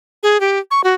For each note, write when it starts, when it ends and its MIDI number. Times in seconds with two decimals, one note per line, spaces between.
0.23 0.40 68
0.40 0.59 67
0.71 0.84 85
0.84 0.95 66